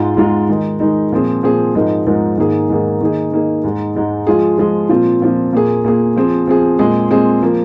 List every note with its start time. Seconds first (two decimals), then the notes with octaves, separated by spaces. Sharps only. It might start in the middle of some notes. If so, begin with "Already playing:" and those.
Already playing: G#2 G#3 F4
0.17 G#2 G#3 F4
0.49 D#3 G#3 D#4
0.80 D#3 G#3 D#4
1.12 A#2 F3 C4 G#4
1.43 A#2 F3 C4 G#4
1.75 G#2 F3 G#3 D#4 A#4
2.07 G#2 F3 G#3 D#4 A#4
2.38 G#2 D#3 A#3 G#4
2.70 G#2 D#3 A#3 G#4
3.01 D#3 A#3 D#4 G#4
3.32 D#3 A#3 D#4 G#4
3.64 G#2 G#3 D#4
3.95 G#2 G#3 D#4
4.27 F3 G#3 F4 G#4
4.58 F3 G#3 F4 G#4
4.89 A#2 F3 C4 F4
5.22 A#2 F3 C4 F4
5.53 A#2 A#3 G#4
5.84 A#2 A#3 G#4
6.16 F3 C4 G#4
6.48 F3 C4 G#4
6.79 A#2 G#3 C4 G#4
7.11 A#2 G#3 C4 G#4
7.43 F3 A#3